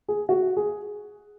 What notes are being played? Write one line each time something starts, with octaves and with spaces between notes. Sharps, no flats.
G#4
F#4
G#4